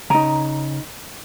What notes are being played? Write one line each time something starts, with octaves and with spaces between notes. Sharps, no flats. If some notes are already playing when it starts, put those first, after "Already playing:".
C#3 D#4 A#5